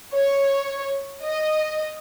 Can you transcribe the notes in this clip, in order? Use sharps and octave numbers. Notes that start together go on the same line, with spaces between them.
C#5
D#5